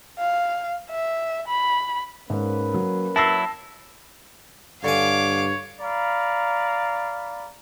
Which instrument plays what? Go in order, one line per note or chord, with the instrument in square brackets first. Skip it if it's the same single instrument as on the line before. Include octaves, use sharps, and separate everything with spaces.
[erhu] F5
E5
B5
[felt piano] G#2 [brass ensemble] A#3 C#4 B4
[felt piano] F#3
[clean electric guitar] F#3 E4 [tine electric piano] A5 E6 [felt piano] A6 A#6 C7
[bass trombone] G2 [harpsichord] D3 G#5 [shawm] C#5 [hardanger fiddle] F5 D6
[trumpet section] D5 F5 A#5 B5